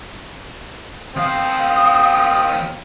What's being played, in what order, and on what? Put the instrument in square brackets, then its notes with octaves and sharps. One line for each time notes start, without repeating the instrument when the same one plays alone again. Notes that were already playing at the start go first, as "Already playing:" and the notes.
[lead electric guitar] D#2 F5 [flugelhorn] C4 [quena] D#6